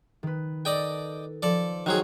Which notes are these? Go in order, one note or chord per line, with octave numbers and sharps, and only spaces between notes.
D#3 B4
A4 D5 D#5 G5
F3 A4 D5
D#3 F#3 F#4 G#4 C5 C#5